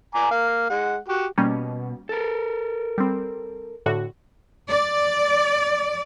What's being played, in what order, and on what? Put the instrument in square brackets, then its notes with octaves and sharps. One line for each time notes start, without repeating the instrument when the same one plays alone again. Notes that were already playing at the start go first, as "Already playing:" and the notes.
[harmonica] G#5 A#5 D6
A#3 F5
G#3 F#5
F#4 G4
[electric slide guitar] B2 [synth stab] G3 A#3 C#4
[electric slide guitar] A4 A#4
[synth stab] G3 C4
A2 D3 F#4
[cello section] D5